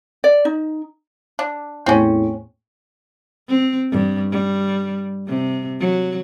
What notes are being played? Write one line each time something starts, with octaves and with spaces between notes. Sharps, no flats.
D5
D#4
D4
E2 A2 C4 C#4
C4
G2
G3
C3
F#3